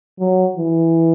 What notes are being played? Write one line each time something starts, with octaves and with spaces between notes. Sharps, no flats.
F#3
E3